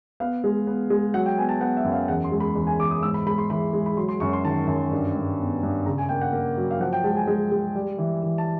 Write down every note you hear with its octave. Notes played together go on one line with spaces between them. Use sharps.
B3 F5
G#3
B3
G#3
F#3 F#5
G5
B3 G#5
A5
B3 F#5
E5
F#2
F5
E2 F#5
C6
G#3
B5
E2
G#5
E2 D6
D#6
G#2 E6
B5
G#3 B5
C6
E3 B5
G#3
B5
F#3 C6
C6
F#2 C#6
C6
D#3 A5
F#2
G2
G2
B3
G2
C#3 A#5
G#5
A#3 G5
F#5
A#3
F#3
F5
F3 F#5
G5
G#3 A5
G#5
G#3
G#3
G3
E3
E3
A5